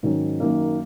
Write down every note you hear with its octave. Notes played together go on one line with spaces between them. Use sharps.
G#2 D#3 F#3 C#4
F#2 D#3 A#3